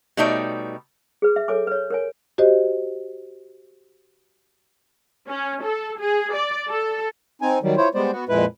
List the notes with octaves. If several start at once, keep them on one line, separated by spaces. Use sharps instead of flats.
B2 G3 A3 D#4 C#5 D5
G#4 B4
E5
A4 C#5 G#5 D6
B4 C#5
A#4 C#5 G#5
F#4 G4 C5 D#5
C#4
A4
G#4
D5
A4
C4 D#4 G#5
D#3 F#3 G3
E4 F4 C5 C#5
G3 G#3 B3 C5 D5
B3 F#4
F2 A#2 G#3 E4 B4